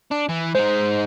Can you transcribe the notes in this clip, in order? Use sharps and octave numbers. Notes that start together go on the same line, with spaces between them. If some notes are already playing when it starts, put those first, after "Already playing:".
D4
E3
G#3 D#4 C5